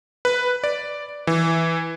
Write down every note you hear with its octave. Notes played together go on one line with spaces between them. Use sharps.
B4
D5
E3